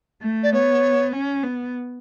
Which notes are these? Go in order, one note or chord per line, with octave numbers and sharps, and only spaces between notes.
A3
D5
B3 C#5
C#4
B3